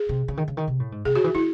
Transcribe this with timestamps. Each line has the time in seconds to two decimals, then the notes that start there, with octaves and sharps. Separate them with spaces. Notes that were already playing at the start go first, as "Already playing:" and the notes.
Already playing: G#4
0.09 C3
0.28 C#3
0.37 D#3
0.48 C#3
0.57 D#3
0.67 C3
0.80 A2
0.92 G#2
1.05 C3 G#4
1.15 C#3 F#4
1.24 E3
1.35 D#3 E4